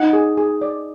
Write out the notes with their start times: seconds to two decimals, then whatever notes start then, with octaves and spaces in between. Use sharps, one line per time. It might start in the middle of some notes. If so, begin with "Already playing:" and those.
Already playing: D#4 D#5 F#5
0.13 G#4
0.37 G#4
0.61 D5